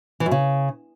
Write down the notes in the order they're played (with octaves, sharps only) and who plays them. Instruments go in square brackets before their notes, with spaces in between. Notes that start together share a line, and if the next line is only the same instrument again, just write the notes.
[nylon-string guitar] E3
F#2
C#3